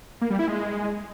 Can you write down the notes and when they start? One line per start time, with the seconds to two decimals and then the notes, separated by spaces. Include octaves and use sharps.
0.21 A#3
0.30 G3
0.39 E4
0.48 G#3